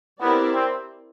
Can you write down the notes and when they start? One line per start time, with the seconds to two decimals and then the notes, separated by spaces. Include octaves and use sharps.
0.21 B3 C4 E4 G4 A#4 D5
0.55 C4